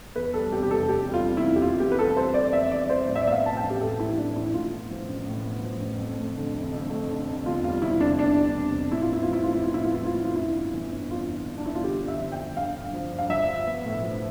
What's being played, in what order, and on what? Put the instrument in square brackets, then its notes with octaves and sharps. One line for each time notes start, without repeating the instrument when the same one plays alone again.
[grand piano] E2 [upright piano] B4
[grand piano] G3 [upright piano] A4
[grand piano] C3 [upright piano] G4
[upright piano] G4
[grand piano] F1 [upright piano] A4
[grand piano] E2 [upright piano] G4
[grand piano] G3
[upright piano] F4
[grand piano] C3
[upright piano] E4
[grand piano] F1
[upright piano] G4
[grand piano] E3 [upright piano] F4
[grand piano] B3 [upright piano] G4
[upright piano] B4
[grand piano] G3 [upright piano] A4
[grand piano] F2 [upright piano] C5
[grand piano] E3 [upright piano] D5
[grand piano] B3 [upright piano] E5
[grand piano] G3 [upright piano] D5
[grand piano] F2 [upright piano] C5
[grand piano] A2 [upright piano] D5
[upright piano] E5
D5
[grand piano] B3 [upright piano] E5
[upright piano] F5
[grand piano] F3 [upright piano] A5
[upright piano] G5
[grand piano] A1
[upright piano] G4
[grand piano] A2 [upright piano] A4
[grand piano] B3 [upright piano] E4
[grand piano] F3 [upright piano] D4
[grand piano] A1 [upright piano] E4
[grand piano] A2 [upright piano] F4
[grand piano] B3
F3
A1
A2
B3
F3
A1
F2
A3
D3
F1
F2
A3
D3
F1
[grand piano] E2 [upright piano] F4
[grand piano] G3 [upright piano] F4
[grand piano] C3 [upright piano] E4
[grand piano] F1 [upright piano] D4
[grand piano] E2 [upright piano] D4
[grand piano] G3
C3
F1
[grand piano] A2 [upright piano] E4
[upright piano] F4
[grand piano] B3 [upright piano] E4
[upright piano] F4
[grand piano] F3
[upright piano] E4
[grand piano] A1 [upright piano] F4
[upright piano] E4
[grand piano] A2 [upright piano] F4
[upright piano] E4
[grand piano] B3 [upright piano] F4
[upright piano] E4
[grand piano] F3 [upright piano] F4
[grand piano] A1 [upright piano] E4
[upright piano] F4
[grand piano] G2 [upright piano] E4
[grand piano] G1
E3
G1
[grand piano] G2 [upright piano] F4
[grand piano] G1
E3
[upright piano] D4
[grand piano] G1 [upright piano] E4
[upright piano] F4
[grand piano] D3 [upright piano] G4
[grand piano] G2
[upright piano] E5
[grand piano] F3
[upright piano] G5
[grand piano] G2
[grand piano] D3 [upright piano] F5
[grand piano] G2
F3
G2
[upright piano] F5
[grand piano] F3 [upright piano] E5
[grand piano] F4
B3
A2
F3